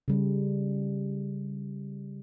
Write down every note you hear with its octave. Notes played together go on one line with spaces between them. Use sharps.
C#3 G3